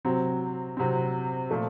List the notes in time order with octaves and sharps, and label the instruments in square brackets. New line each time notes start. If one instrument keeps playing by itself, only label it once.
[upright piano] C3 F#3 C4
C3 F#3 C4
A#2 F3 A3